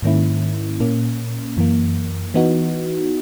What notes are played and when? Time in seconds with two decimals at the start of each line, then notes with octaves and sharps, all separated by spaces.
0.02 G#2 D#3 A#3 C#4 E4
0.80 A#2 A#3 C#4
1.57 F#2 E3 A#3
2.34 E3 B3 D#4 F#4